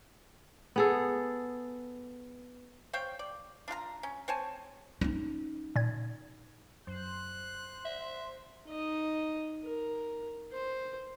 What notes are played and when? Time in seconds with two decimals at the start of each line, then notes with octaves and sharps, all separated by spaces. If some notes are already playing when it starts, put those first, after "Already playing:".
0.76 B3 G#4 A4
2.93 C5 C#5 F5 G5
3.19 D5
3.68 D4 F4 F5 A#5
4.03 C#4
4.28 C4 C#5 G#5 A5
5.01 C#4 D#4
5.76 A#2 G#6
6.87 F#2 C5 F#6
7.85 E5
8.67 D#4 D#5
9.64 A#4
10.52 C5